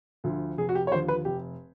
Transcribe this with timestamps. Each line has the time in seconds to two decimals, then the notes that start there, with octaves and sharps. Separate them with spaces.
0.24 D2 D3 F3
0.58 F1 G#4
0.69 F#4
0.75 G4
0.87 C#5
0.91 D#2 D3 F3 C5
1.08 B4
1.25 F1 G4